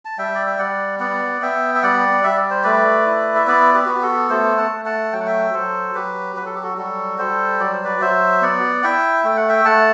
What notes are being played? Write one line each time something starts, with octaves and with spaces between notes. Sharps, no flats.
A5
G3 E5 G5
D5
E5
G3 D5 F#5
B3 D5 F#5
B3 E5 G5
E5
G3 D5 F#5
G3 E5
D5
C5
A3 B4 D5
E4
E5
B3 B4 D5
G4 B4
B3 F#4
G4
F#4 A4
A3 A4 C5
F#5 A5
A3
F#5 A5
F#3 G5
F#5
E5 G5
F#3 A4 C5
F#3 G4 B4
F#3 B4
A4
G4
F#4 A4
G3 F#4 A4
G3 A4 C5
F#3 D5
C5
B4 D5
F#3 C5 E5
B3 D5 F#5
E4 E5 G5
A3 G5
F#5
E5 G5
A3 F#5 A5